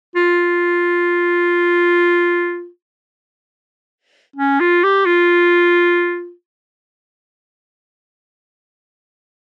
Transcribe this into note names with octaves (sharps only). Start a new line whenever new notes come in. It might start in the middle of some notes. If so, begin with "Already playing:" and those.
F4
C#4
F4
G4
F4